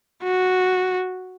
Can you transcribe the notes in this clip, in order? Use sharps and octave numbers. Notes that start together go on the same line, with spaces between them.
F#4